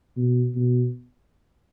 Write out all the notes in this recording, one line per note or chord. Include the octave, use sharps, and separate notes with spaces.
B2
B2